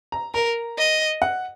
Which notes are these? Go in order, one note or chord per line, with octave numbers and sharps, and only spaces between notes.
A#5
A#4 A#5
D#5
F#5